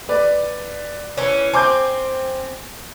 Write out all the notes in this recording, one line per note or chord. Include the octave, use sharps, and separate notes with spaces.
B4 D5
E3 C#4
C4 G#5 D6 G6